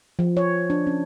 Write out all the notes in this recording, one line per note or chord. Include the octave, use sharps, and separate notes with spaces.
F3
C#5
D4
C#4